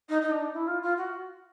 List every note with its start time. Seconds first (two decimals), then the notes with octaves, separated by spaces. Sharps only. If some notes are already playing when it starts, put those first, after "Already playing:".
0.09 D#4
0.21 D#4
0.31 D4
0.53 E4
0.67 F4
0.82 F4
0.97 F#4